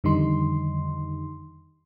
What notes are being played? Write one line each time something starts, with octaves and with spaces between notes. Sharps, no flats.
F2 D3 D#3 G3 D#4 C6